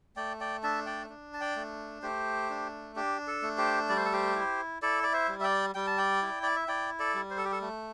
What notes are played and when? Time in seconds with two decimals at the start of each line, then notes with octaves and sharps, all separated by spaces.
0.16 A3 D5 G5
0.40 D5 G5
0.63 D4 E5 A5
0.86 D5 G5
1.10 D4
1.34 A5
1.41 D5 G5
1.56 A3
2.03 A3 G4 C5
2.50 D4
2.96 D4 G4
3.27 A4
3.42 A3
3.58 G4 C5
3.89 G3 D5
3.97 C5
4.05 A4
4.13 G4 C5
4.35 E4
4.82 E4 A4 D5
5.03 D5
5.13 C5 E5
5.28 G3
5.40 E5
5.44 D5 G5
5.75 G3 G5
5.87 A5
5.98 D5 G5
6.22 E4
6.43 D5
6.56 E5
6.68 E4 D5 G5
6.99 A4 D5
7.15 G3
7.31 C5
7.37 A4
7.45 G4
7.52 A4
7.62 A3